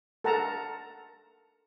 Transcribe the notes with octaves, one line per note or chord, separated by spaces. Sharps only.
A4 A#4 F#5 A5 A#5